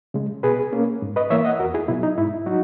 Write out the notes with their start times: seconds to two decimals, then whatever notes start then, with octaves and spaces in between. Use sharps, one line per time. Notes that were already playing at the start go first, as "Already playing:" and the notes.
0.14 C#3 G#3
0.43 B2 G#4 B4
0.73 A#3 C#4
1.02 G#2
1.16 B4 D#5
1.30 E3 A#3 C#5 E5
1.45 D#5 F#5
1.59 E2 F#4 A#4
1.74 E4 G#4
1.88 B2 F#3 E4
2.03 D#4
2.17 G#2 E4
2.46 F#3 D#4 F#4